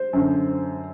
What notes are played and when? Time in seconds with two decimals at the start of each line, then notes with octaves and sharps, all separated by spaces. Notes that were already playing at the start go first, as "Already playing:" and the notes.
Already playing: C5
0.13 F#2 D3